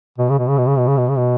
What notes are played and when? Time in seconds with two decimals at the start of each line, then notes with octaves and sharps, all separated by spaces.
0.18 B2
0.29 C#3
0.38 B2
0.48 C#3
0.58 B2
0.68 C#3
0.78 B2
0.87 C#3
0.97 B2
1.08 C#3
1.17 B2